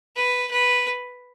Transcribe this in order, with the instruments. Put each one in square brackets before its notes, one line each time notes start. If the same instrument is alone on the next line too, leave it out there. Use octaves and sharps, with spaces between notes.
[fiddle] B4
B4